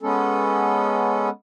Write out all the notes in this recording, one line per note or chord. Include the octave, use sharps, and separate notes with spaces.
G#3 B3 C#4 A4